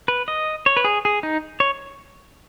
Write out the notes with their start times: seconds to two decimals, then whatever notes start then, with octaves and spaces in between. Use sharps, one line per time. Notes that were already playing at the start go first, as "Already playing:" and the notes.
0.08 B4
0.28 D#5
0.66 C#5
0.77 B4
0.85 G#4
1.05 G#4
1.23 D#4
1.60 C#5